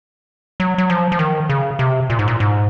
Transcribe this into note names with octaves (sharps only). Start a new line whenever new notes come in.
F#3
F#3
F3
F3
D#3
C#3
C3
A#2
G#2
A#2
G#2